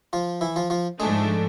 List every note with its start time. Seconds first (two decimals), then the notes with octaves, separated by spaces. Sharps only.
0.13 F3 F4
0.41 E3 E4
0.56 F3 F4
0.70 F3 F4
1.00 G#2 F3 G#3 A3 D4 G#4